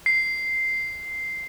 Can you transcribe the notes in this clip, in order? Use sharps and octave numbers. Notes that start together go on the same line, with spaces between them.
C7